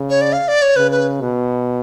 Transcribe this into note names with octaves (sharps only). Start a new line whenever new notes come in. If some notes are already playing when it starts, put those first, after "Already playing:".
Already playing: C#3
C#5
D5
F5
D5
C#5
C#3 B4
B4
B2